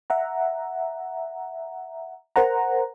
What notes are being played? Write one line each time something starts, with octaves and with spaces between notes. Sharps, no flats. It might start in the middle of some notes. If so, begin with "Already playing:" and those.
E5 F#5 A#5
A#4 C5 F#5 A#5